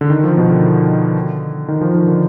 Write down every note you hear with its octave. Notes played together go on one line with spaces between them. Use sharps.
D3
D#3
F3
B2
D3
D#3
F3
D#3
D3